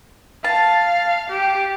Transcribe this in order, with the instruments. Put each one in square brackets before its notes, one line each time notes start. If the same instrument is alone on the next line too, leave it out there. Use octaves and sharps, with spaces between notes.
[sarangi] F5 [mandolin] A5
[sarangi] G4